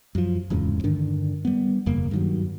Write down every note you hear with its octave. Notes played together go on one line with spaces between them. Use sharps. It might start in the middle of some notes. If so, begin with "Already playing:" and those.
F#2 F3
D1 E2 G#2 C#3
G2 D3 D#3 D4
G3 B3
E1 F#2 C#3 A#3
G2 D#3 F#3